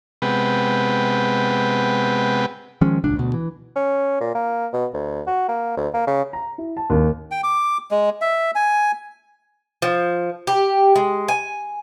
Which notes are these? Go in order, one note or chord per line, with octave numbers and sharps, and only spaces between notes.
C3 G#3 B3 B4 F#5 G5
D#3 F3 G#3 C#4
D#1 C#2 D4
D2 B2
E3
C#4
A#2
A#3
B2
D2
F#4
A#3
D2
A#3
C#3
A#5
E4
A5
D#2
G5
D6
G#3
E5
G#5
F3
G4
G#3
G#5